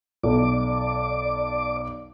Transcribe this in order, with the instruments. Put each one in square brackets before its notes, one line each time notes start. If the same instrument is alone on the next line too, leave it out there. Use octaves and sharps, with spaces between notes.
[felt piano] B1 [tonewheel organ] D5 D6